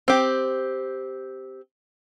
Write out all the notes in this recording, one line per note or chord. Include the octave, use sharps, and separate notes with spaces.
C4 G4